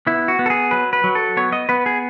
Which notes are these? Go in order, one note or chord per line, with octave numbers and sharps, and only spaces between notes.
B3 E4
F#4
B3
A4
G#4
F#3 B4
B4
F#3
A4
B3 C#5
D#5
B3 B4
G#4